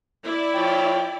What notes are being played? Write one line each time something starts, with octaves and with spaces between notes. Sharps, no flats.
E4 D5
F3 C#5 G5